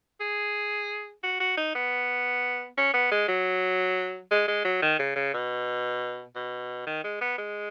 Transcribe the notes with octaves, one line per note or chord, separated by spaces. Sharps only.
G#4
F#4
F#4
D#4
B3
C#4
B3
G#3
F#3
G#3
G#3
F#3
D#3
C#3
C#3
B2
B2
D#3
G#3
B3
G#3